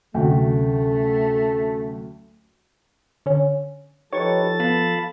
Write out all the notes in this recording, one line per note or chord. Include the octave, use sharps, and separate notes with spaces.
D2 C3 F#3 A3 C#4 F#4 G5
D3 C#4
F3 D#4 G4 A4 B4 C#5 C#6 A6
B3 F5 A5 B5